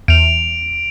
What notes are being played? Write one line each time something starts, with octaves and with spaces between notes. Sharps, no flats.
E2 D7 F7